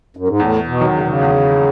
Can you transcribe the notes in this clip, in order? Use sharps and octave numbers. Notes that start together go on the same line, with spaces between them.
F#2
G#2
E2 A2
B2
D#3 F#3
C#3
B2
C#3
E2